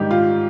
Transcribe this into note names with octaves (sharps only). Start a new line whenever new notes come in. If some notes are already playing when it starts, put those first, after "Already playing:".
Already playing: G#2 D#3 G3 G4
F4